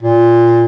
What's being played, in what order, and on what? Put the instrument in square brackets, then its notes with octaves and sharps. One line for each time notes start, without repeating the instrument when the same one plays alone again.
[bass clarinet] A#2